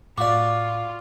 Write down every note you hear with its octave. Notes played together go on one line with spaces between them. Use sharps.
A2 F4 F#4 D5 F5 D6